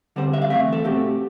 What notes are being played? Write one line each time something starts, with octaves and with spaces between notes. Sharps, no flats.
D3 G3 C4 C5
E5
F5
E3 A3 C4 E5
A4
B2 A3 C4 G4